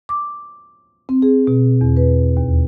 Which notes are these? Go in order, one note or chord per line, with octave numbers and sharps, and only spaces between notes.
D6
C4
G#4
B2
E2
B4
D#2